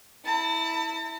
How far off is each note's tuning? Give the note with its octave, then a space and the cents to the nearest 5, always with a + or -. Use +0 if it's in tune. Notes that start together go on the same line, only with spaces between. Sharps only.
E4 -15 A5 +45